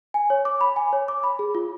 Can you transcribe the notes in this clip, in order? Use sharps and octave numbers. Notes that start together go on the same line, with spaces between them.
G#5
C#5
D6
B5
G#5
C#5
D6
B5
G#4
F4